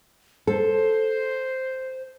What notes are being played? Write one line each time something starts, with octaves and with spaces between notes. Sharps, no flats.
A4 C5